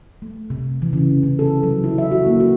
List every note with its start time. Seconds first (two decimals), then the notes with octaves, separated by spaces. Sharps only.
0.22 A3
0.50 C3
0.82 E3
0.93 C#3
1.23 C#3
1.39 A4
1.63 F#3
1.84 E4
1.98 E5
2.11 F#4
2.26 A#3
2.40 F#4